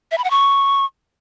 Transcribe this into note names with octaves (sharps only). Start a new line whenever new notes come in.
E5
B5
F#5
C#6